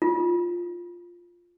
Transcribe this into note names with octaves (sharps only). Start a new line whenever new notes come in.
F4